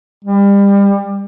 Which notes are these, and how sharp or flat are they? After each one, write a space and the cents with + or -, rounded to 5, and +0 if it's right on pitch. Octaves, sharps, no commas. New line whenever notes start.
G3 +30